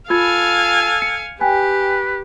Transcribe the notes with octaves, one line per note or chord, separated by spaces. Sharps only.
F4 A4 F5 G#5 B5 G#6
C#7
G4 B4 G5 G#5